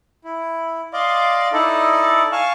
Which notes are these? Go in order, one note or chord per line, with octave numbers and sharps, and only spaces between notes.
E4
D5 D#5 F5 C6 D6
D#4 E4 A4 D5 D#5
F5 G#5 A5 C#6 F6